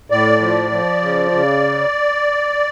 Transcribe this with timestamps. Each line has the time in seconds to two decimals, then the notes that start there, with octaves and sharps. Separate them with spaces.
0.10 A2 D5
0.41 F3
0.71 F3
1.02 C#3
1.32 C#3